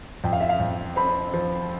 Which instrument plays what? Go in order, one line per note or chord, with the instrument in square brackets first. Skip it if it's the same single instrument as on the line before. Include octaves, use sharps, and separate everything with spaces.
[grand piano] F2 [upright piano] G5
[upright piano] F5
E5
F5
[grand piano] F2
[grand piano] C4 [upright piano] B5
[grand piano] F3